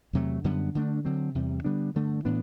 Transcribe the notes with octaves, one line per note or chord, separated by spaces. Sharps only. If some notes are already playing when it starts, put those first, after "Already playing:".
E2 C3 F#3 A3
F#2 D3 G3 B3
D3 A3 D4
D3 F#3 C4
E2 C3 G3
D3 G3 B3 D4
G2 D3 A3
A2 E3 B3 D4